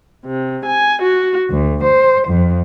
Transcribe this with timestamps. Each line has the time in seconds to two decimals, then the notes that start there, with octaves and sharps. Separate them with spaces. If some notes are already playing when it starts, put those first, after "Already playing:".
0.25 C3
0.65 G#5
1.01 F#4
1.50 D2
1.84 C5
2.27 F2